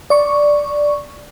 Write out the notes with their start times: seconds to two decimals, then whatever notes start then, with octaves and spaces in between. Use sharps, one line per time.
0.10 D5 C#6